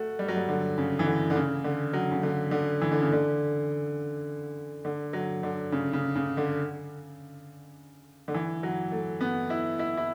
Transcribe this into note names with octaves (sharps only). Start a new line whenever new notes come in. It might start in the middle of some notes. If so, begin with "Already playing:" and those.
Already playing: A3 F#4
G3
F#3
G3
D3
C#3
E3
D3
D3
C#3
D3
F#3
C#3
D3
D3
E3
D3
C#3
D3
D3
F#3
D3
C#3
C#3
C#3
D3
D3
E3
F#3
A3
B3
E4
E4
E4